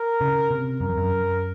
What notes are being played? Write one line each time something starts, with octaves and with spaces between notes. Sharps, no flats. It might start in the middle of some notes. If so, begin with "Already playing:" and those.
Already playing: A#4
C#3
C3
F#2 A#4
F2
F#2